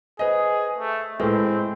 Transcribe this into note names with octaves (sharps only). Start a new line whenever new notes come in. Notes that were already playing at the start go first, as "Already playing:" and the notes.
G#4 B4 C5 D#5 G#5
A3
A2 G#3 C4 A4 B4 C5